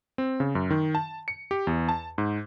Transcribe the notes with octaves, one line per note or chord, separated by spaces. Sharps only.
C4
C#3
F#2
D#3
A5
C#7
G4
E2
A5
G#2